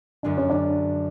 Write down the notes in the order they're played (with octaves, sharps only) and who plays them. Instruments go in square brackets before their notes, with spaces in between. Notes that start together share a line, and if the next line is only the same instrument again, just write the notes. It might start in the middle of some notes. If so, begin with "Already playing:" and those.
[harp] F#2 D3 G#3 [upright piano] D4
[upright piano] C#4
D4